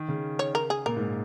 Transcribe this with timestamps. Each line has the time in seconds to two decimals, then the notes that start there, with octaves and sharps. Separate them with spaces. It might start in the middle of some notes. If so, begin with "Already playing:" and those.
Already playing: D#3
0.08 C#3
0.39 C#5
0.55 A#4
0.70 G#4
0.86 A#2 A#4
0.96 G#2